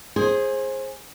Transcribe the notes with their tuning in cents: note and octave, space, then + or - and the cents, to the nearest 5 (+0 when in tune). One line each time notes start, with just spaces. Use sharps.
G#4 +0 C5 +25